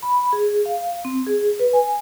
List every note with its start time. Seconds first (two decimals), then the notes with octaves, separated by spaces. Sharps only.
0.03 B5
0.33 G#4
0.66 F5
1.05 C4
1.26 G#4
1.59 B4
1.73 G#5